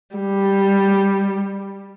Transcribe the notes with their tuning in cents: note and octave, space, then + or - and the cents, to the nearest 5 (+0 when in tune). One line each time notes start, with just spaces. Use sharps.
G3 +5